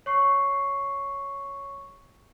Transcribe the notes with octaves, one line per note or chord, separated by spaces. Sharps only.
C#5 C#6 C7